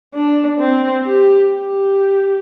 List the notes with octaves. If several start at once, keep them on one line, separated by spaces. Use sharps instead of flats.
D4
C4
G4
G4